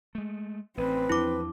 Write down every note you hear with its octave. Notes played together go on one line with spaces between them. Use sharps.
G#3 A3
A1 C4 B4
E2 F3 D4 E4 D6